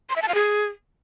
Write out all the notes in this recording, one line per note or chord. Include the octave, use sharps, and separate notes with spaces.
C6
E5
A5
F5
G#4